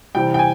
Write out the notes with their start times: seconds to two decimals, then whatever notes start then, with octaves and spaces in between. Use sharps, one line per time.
0.15 C3 E3 G3 G5
0.34 G5
0.39 G#5